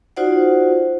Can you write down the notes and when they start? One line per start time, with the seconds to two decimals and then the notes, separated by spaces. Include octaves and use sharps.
0.17 D#4 F4 F#4 C5 D5 F#5